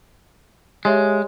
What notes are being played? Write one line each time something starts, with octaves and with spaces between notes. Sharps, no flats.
G#3 G4 C#5 E5